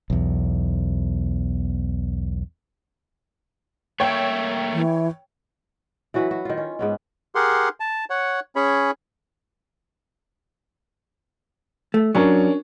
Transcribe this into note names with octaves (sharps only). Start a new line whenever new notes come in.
B1 E2
A3 A#3 C#5 E5 G5
E3
E3 F#3 F#4 B4
F#4
D#3 F4
C#4
G#2 B3 C#4
G4 G#4 A#4 F#5 C6
A5
C#5 F#5
C#4 G#4 C#5 B5
A3
F#3 C#4 D4 A#4